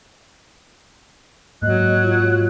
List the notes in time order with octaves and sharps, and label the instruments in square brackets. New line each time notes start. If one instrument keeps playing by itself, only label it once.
[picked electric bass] G#2 A#3 [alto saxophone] F#3 [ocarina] D#5 [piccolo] F#6
[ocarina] F4